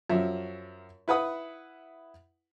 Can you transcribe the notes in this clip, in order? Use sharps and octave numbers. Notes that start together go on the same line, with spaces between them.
F#2 F3 E5
E4 B4 F#5 D#6